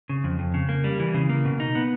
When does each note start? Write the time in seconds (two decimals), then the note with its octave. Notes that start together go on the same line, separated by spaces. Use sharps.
0.09 C#3
0.24 F2
0.39 F2
0.54 C#3
0.69 A#3
0.84 G3
1.00 E3
1.14 C#3
1.29 A#3
1.45 B2
1.60 D#4
1.75 B3